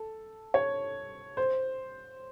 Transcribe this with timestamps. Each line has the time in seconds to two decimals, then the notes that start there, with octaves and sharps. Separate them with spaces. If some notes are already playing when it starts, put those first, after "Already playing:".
Already playing: A4
0.54 C#5
1.37 C5